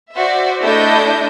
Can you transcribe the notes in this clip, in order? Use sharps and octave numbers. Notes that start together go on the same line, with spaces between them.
F#4 C5 D5 E5
A3 D4 E4 D#5 G6